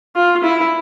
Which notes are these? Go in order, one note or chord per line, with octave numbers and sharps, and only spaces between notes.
F4
E4